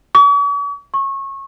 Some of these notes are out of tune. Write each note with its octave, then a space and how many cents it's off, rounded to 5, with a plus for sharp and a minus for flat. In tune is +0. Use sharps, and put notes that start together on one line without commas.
C#6 +45
C#6 -25